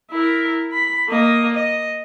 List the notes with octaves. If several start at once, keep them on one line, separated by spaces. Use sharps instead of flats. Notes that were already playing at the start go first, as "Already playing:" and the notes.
E4 A#4
B5
A#3 D#5
D#5